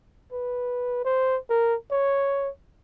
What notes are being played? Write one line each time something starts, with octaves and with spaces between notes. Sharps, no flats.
B4
C5
A#4
C#5